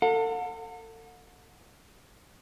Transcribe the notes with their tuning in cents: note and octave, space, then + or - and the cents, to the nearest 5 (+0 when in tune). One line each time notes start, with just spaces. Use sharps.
A4 +40 F#5 -40